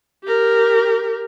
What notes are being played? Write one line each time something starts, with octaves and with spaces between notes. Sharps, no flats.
G4 A#4